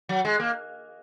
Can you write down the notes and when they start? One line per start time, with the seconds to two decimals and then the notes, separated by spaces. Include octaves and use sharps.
0.09 F#3
0.25 G#3
0.40 A#3